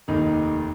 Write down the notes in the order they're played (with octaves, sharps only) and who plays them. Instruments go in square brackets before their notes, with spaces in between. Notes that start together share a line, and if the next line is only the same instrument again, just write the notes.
[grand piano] F1 D#2 D#3 D#4